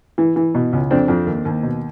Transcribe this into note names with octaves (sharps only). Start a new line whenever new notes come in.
E3
E3
B2
C#2
F2 C4 D4
F2
D#2
D#2
B2